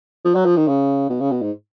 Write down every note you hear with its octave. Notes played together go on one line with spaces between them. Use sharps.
F3
F#3
F3
D#3
C#3
B2
C#3
B2
G#2